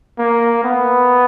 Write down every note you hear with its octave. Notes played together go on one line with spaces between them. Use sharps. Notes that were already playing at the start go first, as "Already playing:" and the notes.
A#3
B3